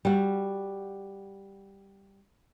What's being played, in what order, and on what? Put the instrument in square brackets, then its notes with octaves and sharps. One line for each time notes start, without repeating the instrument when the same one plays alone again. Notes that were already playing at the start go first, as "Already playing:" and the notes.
[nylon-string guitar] G3 F#4